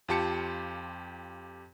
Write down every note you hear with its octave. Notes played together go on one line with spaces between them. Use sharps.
F2 F4 G4 A5 C#7